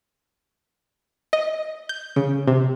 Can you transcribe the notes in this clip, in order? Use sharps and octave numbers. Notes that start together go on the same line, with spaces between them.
D#5
G6
C#3
C3